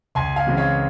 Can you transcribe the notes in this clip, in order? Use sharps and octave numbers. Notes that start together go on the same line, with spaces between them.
C#2 G#5 C6
F5 G#5
C#3 E3 G#3 C4
C#5 F5